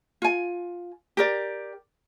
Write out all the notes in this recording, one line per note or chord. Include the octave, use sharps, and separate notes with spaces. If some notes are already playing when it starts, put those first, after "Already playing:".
F4 G#5
G4 A#4 D5